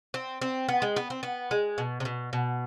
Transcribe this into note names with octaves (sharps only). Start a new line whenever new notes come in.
C4
C4
B3
G#3
B3
C4
B3
G#3
B2
C3
B2
B2